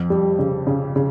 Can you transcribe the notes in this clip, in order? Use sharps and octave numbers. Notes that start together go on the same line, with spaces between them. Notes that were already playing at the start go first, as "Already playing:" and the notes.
Already playing: F2
G3
C#3
C#3
C#3